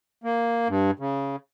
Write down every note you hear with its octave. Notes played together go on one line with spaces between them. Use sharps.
A#3
G2
C#3